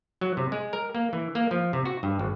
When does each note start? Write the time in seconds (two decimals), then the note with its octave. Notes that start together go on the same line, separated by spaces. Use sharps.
0.21 F#3
0.37 C3
0.52 G#3
0.73 A#4
0.95 A#3
1.13 E3
1.35 A#3
1.51 F3
1.73 C3
1.85 F#4
2.03 G2
2.19 G#1